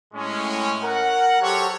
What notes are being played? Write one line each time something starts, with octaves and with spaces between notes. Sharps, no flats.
A2 G#3 C#4
A#4 F#5
F#3 G4 A4 C5 C#5